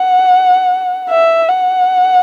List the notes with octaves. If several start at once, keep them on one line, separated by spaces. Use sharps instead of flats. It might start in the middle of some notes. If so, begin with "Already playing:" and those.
Already playing: F#5
E5
F#5